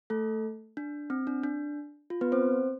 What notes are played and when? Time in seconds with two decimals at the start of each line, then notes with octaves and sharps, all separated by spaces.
0.10 A3 A4
0.77 D4
1.10 C4
1.27 D4
1.43 D4
2.10 F4
2.21 B3 B4
2.32 C4 C5